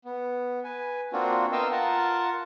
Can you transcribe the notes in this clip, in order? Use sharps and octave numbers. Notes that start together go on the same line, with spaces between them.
B3
B4 G#5
A#3 C4 D4 F4 F#4
B3 A#4 D#5 F5 G5 E6
F4 A#4 F#5 A5